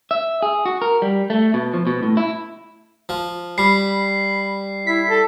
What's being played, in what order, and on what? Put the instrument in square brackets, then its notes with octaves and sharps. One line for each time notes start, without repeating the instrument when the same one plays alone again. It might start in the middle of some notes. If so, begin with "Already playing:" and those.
[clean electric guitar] E5
G#4
F#4
A#4
G3
A3
B2
F3
B2
A2
E4
[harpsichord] F3
[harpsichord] G3 [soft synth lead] B5 [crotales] C7
[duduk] E4 [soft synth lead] B6
[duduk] A4